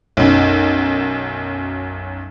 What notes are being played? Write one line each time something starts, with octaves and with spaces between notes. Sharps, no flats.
B1 F#2